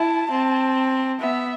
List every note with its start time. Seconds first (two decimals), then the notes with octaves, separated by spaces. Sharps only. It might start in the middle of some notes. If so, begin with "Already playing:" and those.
Already playing: E4 A5
0.31 C4
1.21 B3 E5